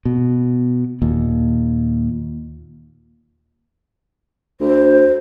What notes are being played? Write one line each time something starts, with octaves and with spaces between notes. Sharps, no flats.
B2
D#2 A#2
D2 C5